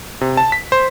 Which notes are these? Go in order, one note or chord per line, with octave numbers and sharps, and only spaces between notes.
C3
A5
B6
C5